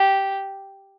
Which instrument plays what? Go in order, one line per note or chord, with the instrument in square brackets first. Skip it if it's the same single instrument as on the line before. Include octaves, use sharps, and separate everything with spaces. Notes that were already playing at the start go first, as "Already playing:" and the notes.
Already playing: [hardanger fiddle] G4